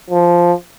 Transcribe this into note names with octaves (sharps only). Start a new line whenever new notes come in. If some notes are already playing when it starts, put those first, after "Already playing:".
F3